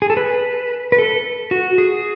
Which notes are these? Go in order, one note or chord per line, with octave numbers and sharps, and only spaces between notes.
G#4
A4
B4
B4
A4
F#4
G#4